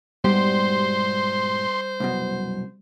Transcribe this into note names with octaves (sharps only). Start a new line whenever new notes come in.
G#2 B2 G3 G4 C5 C6
C2 F#2 B2